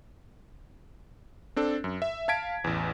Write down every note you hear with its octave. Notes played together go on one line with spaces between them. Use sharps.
C4 D4 A4
F#2
E5
F5 A5 G#6 B6 D7
A1 E2